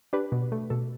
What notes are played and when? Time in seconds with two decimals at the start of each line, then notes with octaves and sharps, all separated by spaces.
0.13 D4 G4 B4
0.32 B2
0.52 A3
0.70 B2 A4